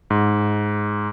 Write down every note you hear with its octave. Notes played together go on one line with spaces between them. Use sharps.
G#2